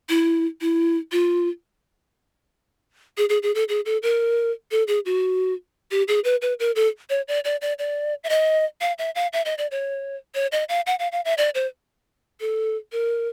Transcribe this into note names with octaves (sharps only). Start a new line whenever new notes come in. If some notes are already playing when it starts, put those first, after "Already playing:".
E4
E4
F4
G#4
G#4
G#4
A4
G#4
A4
A#4
A4
G#4
F#4
G4
G#4
B4
B4
A#4
A4
C#5
D5
D5
D5
D5
E5
D#5
F5
E5
F5
E5
D#5
D5
C#5
C#5
D#5
F5
F#5
F5
F5
E5
D5
C5
A4
A#4